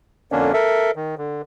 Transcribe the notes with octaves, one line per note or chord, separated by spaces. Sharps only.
F2 D3 A#3 C#4 D4
A4 A#4 E5
D#3
D3